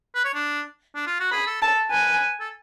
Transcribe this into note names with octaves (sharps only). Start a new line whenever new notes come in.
B4
C#5
D4
D4
F4
F#4
G#4 B5
A4
A4 A5
B4 G#5
A4